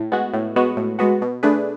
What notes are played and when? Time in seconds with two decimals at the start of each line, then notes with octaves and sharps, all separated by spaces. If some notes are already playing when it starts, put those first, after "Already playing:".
Already playing: A2
0.12 G#3 B3 F#4
0.33 A2
0.56 G#3 B3 F#4
0.77 A2
0.99 G#3 B3 F#4
1.22 B2
1.43 A3 D4 G#4 B4